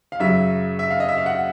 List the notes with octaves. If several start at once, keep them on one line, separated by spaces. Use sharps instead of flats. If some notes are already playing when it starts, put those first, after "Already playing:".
F5
F#2 C#3 F#3 E5
E5
F5
D#5
E5
F5
F#5